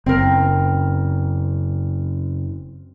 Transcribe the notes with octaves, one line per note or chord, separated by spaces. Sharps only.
F#1 C4 A#4